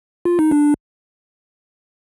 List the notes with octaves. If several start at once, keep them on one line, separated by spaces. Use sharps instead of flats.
F4
D#4
D4